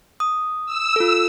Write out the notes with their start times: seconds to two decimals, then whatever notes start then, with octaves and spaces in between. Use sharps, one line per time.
0.20 D#6
0.66 E6
0.96 F4 A4